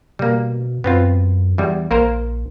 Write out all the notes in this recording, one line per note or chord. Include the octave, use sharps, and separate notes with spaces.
B2 G3 A#3
F#2 B3 C4 F4
E2 G3
A#1 A#3 A#4 C5